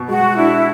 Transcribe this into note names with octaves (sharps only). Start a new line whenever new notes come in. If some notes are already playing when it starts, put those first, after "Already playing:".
Already playing: B2
G#3 F#4
D4 E4